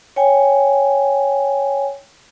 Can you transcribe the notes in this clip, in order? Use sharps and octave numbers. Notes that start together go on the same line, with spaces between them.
C#5 G5 G#5